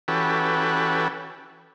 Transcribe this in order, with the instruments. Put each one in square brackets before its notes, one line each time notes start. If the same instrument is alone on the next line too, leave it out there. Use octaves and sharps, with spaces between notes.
[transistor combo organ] E3 C#4 F#4 G4 A4 B4